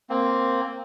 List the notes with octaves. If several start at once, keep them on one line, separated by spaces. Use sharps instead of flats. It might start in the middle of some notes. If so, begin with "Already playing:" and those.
A#3 C4